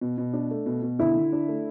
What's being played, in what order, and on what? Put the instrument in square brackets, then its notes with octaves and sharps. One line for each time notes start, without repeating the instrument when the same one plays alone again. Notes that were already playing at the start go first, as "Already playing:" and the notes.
[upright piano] B2
B2
D4
A3
B2
B2
[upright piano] D3 [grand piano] E4
[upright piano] D3
D4
A3